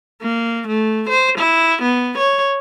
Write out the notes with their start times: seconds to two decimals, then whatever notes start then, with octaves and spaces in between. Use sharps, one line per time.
0.22 A#3
0.67 A3
1.09 C5
1.38 E4
1.82 B3
2.18 C#5